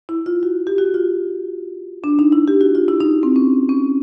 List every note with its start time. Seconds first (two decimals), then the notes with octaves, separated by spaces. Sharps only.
0.09 E4
0.26 F4
0.43 F#4
0.67 G4
0.78 F#4
0.94 F4
2.04 D4
2.19 D#4
2.32 E4
2.48 G4
2.61 F#4
2.75 F4
2.88 E4
3.01 D#4
3.23 C4
3.36 C#4
3.69 C#4